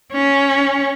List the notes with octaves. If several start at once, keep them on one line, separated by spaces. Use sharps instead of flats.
C#4